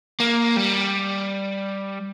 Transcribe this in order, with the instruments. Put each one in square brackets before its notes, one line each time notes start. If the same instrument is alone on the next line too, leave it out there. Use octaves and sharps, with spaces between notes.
[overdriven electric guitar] A#3
G3